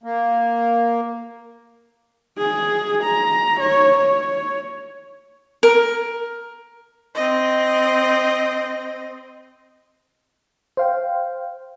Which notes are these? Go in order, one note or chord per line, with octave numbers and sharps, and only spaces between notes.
A#3
G#4
A#5
C#5
C#5
A#4
C4 D#5
C5 F5 G5